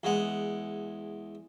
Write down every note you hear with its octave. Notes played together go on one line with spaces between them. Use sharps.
E2 G#3 F#5